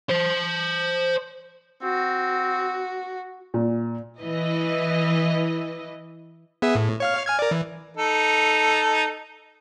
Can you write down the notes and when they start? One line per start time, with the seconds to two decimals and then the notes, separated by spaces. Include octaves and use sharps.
0.09 C5 A5
1.83 C4 F#4
3.54 A#2
4.22 E3 E4 B4 D#5
6.62 B3 G#4 E5
6.75 A2
7.00 C#5 F5 F6
7.26 G#5 F6 G#6
7.39 A#4 D5
7.51 E3
7.97 D#4 A4